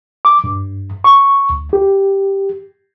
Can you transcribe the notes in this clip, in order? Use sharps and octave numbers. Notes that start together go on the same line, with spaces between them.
D6
G2
C#6
D2
G4